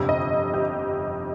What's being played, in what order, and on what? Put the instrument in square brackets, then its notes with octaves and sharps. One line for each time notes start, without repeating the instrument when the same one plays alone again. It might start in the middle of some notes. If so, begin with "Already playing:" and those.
Already playing: [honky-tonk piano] G1 F2 C3
D#5
G4